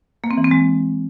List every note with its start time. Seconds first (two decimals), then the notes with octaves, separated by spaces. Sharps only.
0.24 A#3
0.31 C4
0.37 E3
0.44 C4
0.51 G#3